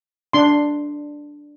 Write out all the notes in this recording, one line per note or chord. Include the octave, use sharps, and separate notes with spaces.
D4 C6